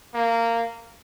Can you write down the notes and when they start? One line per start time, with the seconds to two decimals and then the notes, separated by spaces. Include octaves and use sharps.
0.14 A#3